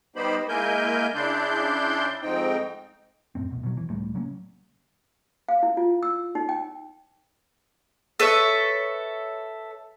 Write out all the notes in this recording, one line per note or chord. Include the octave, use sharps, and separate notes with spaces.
G3 B3 D#4 G4 C5 B5
G#3 A#3 E4 A#4 G#5 G6
C#3 D4 E4 D5 C6 G6
F2 G#2 C4 D#4 G5
D#1 F#2 A2 C4
D#1 B1 B2
B2 F#3
E3
C#2 A2 G3 A3
C#3 F#3 A#3 C#4
F5
E4
F4
E6
D#4
G5
A4 B4 C#5 E5